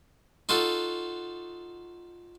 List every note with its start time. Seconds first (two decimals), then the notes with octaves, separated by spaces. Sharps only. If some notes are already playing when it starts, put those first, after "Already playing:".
0.49 D#4 F4 F#4 A4